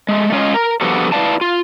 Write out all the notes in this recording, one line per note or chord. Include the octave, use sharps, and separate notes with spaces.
G#3 A3
G#3 C#4 F4 C#5 D#5
A#4
F3 G3 B3 D4 F#4 A4
E4 F4 B4 D5 F5 A5
F4